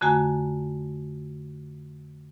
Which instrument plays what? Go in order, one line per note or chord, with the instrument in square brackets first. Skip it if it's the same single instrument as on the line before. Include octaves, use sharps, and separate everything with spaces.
[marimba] F2 D3 A3 F#4 G#5 A#5